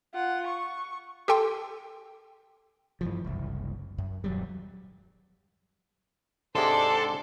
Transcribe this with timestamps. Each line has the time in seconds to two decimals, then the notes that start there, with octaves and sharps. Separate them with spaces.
0.14 F4 F#5
0.47 C#6
1.28 G4 A4 G5 C6
3.01 G2 E3 F3
3.25 F#1 C2
3.98 F#2
4.24 D#1 F#3 G3
6.55 G#2 C3 G#3 D4 A4 C5 D5 C6